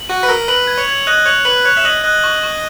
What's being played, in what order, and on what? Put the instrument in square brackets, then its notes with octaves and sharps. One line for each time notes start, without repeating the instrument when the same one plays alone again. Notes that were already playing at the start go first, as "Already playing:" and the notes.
Already playing: [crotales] F#7
[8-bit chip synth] F#4 [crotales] D#7
[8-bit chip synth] B4
[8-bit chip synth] A#4 [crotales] E6
[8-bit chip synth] B4 [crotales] F#7
[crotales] G#6
[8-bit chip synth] C#5
[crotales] G#6
[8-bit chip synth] D#5 [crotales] F#6
[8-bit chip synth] C#5 [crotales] F#7
[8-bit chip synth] B4 [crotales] F#7
[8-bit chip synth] C#5 [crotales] F#6
[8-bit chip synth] E5
[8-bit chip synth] D#5 [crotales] F#7
[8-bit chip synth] D#5 [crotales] F#6
[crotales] C#6
C#6